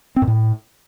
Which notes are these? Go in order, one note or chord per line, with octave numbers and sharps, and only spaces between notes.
C4
G#2
A2